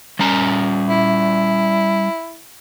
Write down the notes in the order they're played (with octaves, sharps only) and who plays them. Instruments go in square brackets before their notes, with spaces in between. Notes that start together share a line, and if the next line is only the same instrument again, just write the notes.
[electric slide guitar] G3 C#4 A#5
[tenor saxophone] E4